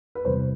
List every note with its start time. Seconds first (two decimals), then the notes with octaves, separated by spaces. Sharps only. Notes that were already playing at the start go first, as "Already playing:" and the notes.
0.15 B4
0.25 E2 C3 E3 G3 C5